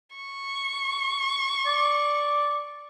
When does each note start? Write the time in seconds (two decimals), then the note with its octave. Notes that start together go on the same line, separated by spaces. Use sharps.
0.16 C#6
1.67 D5